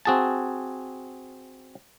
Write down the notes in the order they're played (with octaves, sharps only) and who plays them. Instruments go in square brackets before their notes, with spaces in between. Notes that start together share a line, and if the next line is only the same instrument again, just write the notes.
[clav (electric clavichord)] C4 F#4 G#4 G#5 A5